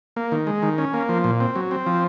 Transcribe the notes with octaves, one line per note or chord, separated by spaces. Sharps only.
A#3
D#3
G#3
D#3
C#4
A#3
F3
A#2
C4
F#3
C4
F3